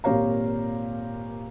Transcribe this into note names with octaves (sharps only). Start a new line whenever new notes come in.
G#1 A#2 G4 C#5 F5 A#5